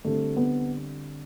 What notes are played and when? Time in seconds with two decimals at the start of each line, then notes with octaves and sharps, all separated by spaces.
0.04 D3 G3 A3 C4
0.36 B3